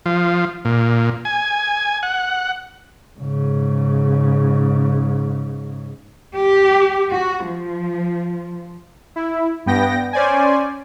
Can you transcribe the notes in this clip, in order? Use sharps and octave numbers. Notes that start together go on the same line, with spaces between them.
F3
A#2
G#5
F#5
G#2 C#3
G4
F#4
F3
E4
G2 B3 G5 A#6
C#4 C5 D5 G#5